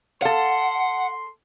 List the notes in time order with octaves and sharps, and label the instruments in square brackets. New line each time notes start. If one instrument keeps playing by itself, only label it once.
[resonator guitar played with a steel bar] A4 F5 [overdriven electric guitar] F#5 [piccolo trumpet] C6